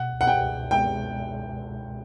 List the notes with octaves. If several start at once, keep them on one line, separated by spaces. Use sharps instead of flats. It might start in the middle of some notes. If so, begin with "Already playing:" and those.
Already playing: B2 F#5
C#2
F#5
G5
C#2
G#3 G5
B2